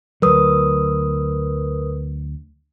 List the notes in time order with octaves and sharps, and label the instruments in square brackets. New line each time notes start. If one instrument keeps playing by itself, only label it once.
[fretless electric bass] D2 F#3 [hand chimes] A#4 B4 D#6